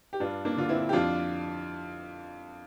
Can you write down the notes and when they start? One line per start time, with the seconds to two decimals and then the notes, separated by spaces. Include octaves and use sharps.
0.13 G4
0.20 G2 D4 F4
0.45 A#3 D4
0.57 D3 F4
0.69 C4 E4
0.89 G4
0.93 F2 D4 F4